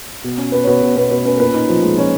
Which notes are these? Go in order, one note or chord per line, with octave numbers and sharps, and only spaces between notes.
B2
C#4
B2 B4
C#5
B2 B4
B2
B2 B4
B2 B4
C#4 B4
A#4
A#2 B4
D#4
F3
G#3
F3 C#4 C#5